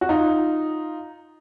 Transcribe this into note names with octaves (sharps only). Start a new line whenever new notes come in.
F#4
D#4 F4